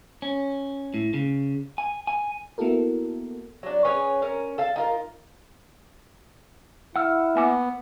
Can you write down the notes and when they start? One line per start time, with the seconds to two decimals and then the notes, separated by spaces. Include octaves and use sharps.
0.22 C#4
0.94 A2
1.14 C#3
1.78 G#5
2.07 G#5
2.58 A#3 B3 E4 F#4 A4 A#4
3.63 F#3 D4
3.85 C#4 G#4 B4 C#5
4.22 C#4 A#4
4.58 A4 F5 A5
4.76 D#4 F4 A#4
6.96 E4 F#5 E6 F6
7.36 A#3 B3 G#5 D6